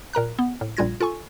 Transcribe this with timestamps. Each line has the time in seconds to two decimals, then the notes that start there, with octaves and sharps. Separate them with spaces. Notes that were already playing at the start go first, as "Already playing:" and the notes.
0.13 A#2 A#4 A#5 F#6
0.39 B3
0.61 A2
0.77 A#1 A#2 G3 F4 G#6 A#6
1.01 F4 A4 G#5 C#6